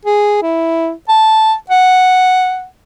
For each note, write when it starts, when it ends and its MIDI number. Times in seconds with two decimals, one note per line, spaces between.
0.05 0.39 68
0.42 0.91 64
1.09 1.54 81
1.70 2.66 78